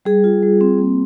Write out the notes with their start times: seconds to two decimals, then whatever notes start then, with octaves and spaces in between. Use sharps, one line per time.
0.05 G3 G#4
0.24 F4
0.42 G3
0.61 C4
0.78 A#3